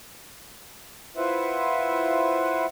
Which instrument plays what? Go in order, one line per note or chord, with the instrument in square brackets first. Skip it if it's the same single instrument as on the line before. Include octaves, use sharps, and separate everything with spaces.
[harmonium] E4 F4 B4 C5 E5 F#5